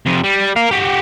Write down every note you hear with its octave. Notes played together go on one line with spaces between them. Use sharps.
C3 F3
G3
A#4 F5
F#4 G4